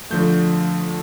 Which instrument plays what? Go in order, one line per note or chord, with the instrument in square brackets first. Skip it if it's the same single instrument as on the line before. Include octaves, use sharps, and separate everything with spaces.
[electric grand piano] D3 F3 A3 G6